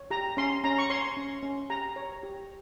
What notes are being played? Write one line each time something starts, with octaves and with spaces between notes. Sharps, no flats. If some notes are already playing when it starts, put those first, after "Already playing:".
Already playing: C#5
G4 A#5
C#4 C6
C#4 A#5
C#6
C#5 C6
C#4
C#4
G4 A#5
C#5
G4